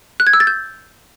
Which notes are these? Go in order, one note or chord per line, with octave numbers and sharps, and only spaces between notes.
F#6
G#6
E6
A6
G6